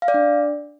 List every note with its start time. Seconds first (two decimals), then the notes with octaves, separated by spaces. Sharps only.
0.02 F5
0.08 D5
0.14 D4